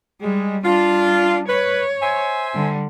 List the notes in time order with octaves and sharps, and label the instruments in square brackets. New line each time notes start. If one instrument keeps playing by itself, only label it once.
[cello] G3 [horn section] G#3
[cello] G3 D4 [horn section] F4
[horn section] B4 [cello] C#5
[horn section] C5 E5 G#5
[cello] D3 G3